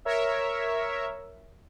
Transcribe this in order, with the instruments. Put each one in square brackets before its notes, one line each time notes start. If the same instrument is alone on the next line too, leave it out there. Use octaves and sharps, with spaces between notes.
[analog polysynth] A#4 C#5 E5